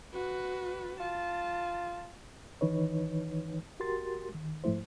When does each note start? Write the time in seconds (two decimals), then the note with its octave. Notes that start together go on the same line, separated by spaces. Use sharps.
0.13 F#4 B4
1.00 F4 A5
2.61 D#3 E3 D#4 B4 C#5
3.80 F#4 G4 A#4 C6 A6
4.34 D#3
4.64 G#2 F3 A3 E4 C5